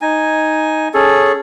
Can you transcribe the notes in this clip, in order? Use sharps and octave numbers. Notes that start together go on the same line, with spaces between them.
D#4 G#5
C#4 G#4 A4